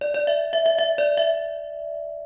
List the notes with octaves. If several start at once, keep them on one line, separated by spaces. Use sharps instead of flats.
D5
D5
E5
E5
E5
E5
D5
E5